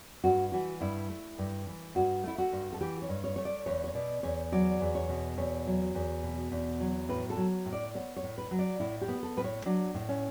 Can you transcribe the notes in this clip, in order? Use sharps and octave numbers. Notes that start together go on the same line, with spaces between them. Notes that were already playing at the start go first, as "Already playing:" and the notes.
G2 F#4
E3 F#4
G2 E4
A3
G2
E3
G2 F#4
A3 E4
F#4
G2
A4
E3 G4
C#5
G2
C#5
A3 C#5
D5
E2 C#5
C#5
B2 D5
E2 C#5
F#3 D5
E2
C#5
B2
E2 C#5
F#3
E2
B2
E2
F#3
A2 B4
A4
F#3
A2
D5
B3 C#5
C#5
A2
B4
F#3
D5
A2 E4
G4
B3
A4
A2 B4
C#5
F#3 D4
A2
C#4